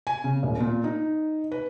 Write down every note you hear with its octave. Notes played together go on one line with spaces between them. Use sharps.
G#5
C#3
D#1
A#2
D#4
B4